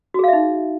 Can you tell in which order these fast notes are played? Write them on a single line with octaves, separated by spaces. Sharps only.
F#4 G#4 F5 E5 D#4